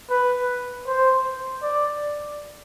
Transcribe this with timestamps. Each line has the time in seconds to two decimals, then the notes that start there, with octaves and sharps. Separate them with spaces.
0.10 B4
0.87 C5
1.63 D5